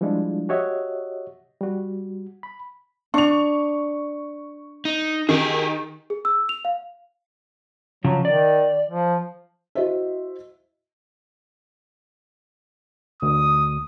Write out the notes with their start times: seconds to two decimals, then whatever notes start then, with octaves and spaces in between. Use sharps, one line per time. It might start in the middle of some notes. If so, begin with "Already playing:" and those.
0.01 F3 G3 G#3 D4 E4 F4
0.49 F#4 G4 C#5 D#5 E5 F#5
1.61 G3 F#4
2.43 B5
3.14 D4 C#6 F7
4.85 D#4
5.29 D#3 G4 G#4
6.10 G#4
6.25 E6
6.49 F7
6.65 F5
8.05 C#3 F3 F#3
8.25 D#3 D5
8.90 F3
9.75 E4 F#4 C5 D#5 E5
13.22 D2 D#6